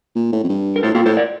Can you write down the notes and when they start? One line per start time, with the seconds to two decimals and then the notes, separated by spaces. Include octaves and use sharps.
0.15 A#2
0.32 A2
0.43 F2
0.49 G2
0.76 A#4
0.83 A2 A4 C5
0.94 A#2 F4 A4
1.05 A2 A4 C5
1.17 A#4 D5